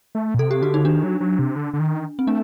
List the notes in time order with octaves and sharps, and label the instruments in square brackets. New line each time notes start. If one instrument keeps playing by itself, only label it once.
[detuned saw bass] A3
A#2
[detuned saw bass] C3 [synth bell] A4
[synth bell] G4
[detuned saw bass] D3 [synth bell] F#4
[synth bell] D#4
[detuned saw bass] D#3 [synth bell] D4
[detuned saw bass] F#3
F#3
C3
D3
D3
D#3
[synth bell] C4
[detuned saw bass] A3 [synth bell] D4